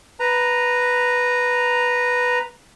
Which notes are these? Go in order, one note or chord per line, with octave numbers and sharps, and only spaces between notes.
B4 A#5